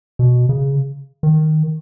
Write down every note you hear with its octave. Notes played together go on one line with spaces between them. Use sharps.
B2
C#3
D#3